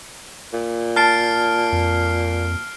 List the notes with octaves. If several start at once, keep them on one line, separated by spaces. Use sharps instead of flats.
A#2
A5 F6 C7 D7
F2